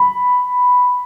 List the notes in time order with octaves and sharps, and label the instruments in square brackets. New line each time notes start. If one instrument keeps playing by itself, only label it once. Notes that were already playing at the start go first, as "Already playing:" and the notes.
Already playing: [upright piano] B5